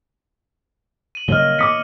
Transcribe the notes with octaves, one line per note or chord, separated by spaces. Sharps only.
D#7 F#7
C#3 F#3 G3 A#3 C#5 D#5 F6 G7
D#3 B3 D6 D#6 B6 C#7